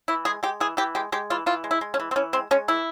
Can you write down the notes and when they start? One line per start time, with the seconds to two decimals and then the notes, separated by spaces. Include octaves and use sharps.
0.08 E3 E4
0.25 G#3 G#4
0.43 G#3 G4
0.60 E3 G#4
0.77 E3 G4
0.95 G#3 G4
1.12 G#3 G4
1.30 E3 F4
1.46 E3 F4
1.64 G#3
1.71 E4
1.81 G#3
1.94 C#4
2.00 E3
2.11 C4
2.16 E3 C#4
2.33 G#3 C4
2.51 G#3 C#4
2.68 E3 E4